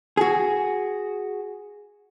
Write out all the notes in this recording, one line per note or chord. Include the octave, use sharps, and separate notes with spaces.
F#4 G#4